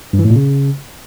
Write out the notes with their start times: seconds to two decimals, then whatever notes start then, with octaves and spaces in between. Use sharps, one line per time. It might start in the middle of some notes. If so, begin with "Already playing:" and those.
0.13 G2
0.19 E3
0.25 A2
0.30 A#2
0.36 C#3